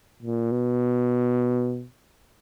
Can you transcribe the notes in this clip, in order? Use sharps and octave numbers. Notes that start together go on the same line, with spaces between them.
A#2
B2